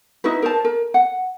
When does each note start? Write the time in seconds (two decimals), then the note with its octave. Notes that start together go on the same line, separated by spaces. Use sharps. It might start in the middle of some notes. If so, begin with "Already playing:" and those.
0.24 D#4 E4 F#4 B4
0.42 A#4 C5 A5
0.65 A#4
0.94 F#5